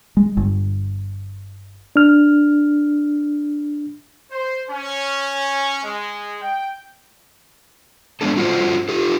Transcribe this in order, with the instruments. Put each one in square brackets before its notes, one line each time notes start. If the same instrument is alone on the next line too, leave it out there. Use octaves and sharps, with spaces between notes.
[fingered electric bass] G#3
G1
[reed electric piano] D4 F6
[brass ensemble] C5
C#4
G#3
G5
[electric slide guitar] G#3 A3 B3 D4 A4
C#4 F4 F#4 G#4 A4 C5
F4 G4 A4